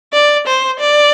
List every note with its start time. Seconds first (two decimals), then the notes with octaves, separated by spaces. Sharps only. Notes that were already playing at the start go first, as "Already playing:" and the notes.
0.13 D5
0.47 C5
0.80 D5